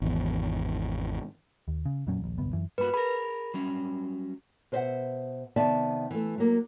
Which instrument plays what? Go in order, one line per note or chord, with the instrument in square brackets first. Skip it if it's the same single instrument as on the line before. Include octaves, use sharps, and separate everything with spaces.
[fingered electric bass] G#1 E2
[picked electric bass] D#2
C#3
F2 A#2 F#3 C#4
D#1 A#1
D1 G1 C2 B3
F#2 E3
[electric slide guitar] G2 A#3 F#4 [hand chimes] B4 B5
[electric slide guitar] G#4 A#4 [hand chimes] B5
[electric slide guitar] F#3 G3 C#4
[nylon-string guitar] B2 B4 C5 D#5 E5 F#5
C3 D#3 B3 D5 E5 A5
E3 A3
F#3 A#3